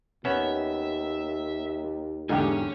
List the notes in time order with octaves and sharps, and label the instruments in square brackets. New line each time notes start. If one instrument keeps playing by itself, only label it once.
[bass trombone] D#2 [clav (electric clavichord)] B3 C#4 [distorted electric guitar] E5
[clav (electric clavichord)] E2 G#2 [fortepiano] D3 G4 [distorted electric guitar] C#5 G#5